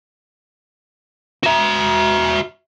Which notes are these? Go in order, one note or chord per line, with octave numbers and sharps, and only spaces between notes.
F#4 E5